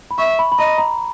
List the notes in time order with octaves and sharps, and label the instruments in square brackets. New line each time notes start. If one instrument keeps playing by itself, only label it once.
[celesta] B5
[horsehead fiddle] E5 [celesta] C#6
[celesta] B5
B5
[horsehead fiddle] D#5 [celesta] A#5
[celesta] A#5